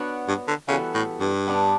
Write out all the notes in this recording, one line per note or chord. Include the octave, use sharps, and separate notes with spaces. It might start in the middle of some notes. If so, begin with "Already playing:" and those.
Already playing: B3 D4 F#4 C#5
G2
D3
C#3 E3 G3 B3 F#4 A4
A2
G2
G3 B3 D4